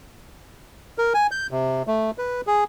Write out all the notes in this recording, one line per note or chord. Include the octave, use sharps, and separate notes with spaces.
A#4
G#5
G6
C3
A3
B4
G#4